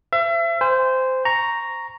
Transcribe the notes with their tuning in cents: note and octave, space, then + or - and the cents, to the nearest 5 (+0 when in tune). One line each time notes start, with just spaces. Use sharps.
C5 +0 E5 +35
C5 -15 G#5 -35
A#5 +0 C#6 +0